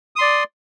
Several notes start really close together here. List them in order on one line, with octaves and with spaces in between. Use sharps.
D#6 C6 D5